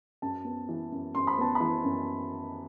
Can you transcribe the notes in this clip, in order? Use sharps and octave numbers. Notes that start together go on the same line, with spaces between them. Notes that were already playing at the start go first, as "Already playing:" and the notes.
F#2 A5
B3
E3
F#2
F#2 C6
B5
B3 A5
B5
E3
F#2